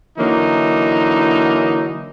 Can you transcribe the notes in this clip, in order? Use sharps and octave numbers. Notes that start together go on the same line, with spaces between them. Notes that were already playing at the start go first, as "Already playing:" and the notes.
D3 E3 F#3 A#3 D#4